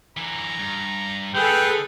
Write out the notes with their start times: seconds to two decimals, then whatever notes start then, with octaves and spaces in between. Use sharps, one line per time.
0.17 D3 E3 A#5
0.60 G2
1.35 D3 G#4 A4 B4 G5